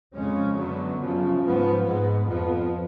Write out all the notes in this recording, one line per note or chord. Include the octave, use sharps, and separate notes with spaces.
F2 C#3 G#3 C#4
F#2 D3 F#3 B3
F#2 C#3 F3
G#2 F3 B3
G#2 G#3 B3
F2 F3 B3